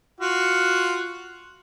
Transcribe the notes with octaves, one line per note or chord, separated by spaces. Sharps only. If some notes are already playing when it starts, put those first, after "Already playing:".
F4 F#4